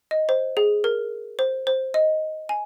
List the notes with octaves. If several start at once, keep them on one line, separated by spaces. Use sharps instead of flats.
D#5
C5
G#4
A#4
C5
C5
D#5
G#5